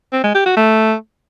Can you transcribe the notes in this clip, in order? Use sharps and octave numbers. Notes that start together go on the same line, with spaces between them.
C4
G#3
G4
F#4
A3